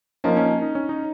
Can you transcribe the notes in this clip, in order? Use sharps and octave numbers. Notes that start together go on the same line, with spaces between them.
F3 A#3 C#4 D#4
C#4
D#4
C#4
D#4